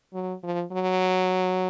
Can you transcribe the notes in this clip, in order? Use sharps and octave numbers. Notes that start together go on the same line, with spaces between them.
F#3
F3
F#3